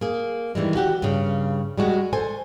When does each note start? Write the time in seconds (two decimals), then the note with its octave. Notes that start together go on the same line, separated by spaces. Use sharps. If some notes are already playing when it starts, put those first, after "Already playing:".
0.01 A#3 G#4
0.55 D#3 E3 G3 G#3
0.75 F#4 G4 F#5
1.02 G2 C#3
1.78 G3 G#3 F#4
2.13 A4 C5 G#5